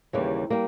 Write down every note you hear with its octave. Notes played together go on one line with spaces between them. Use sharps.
D#2 C#3 E3 G3 A#3
G3 A#3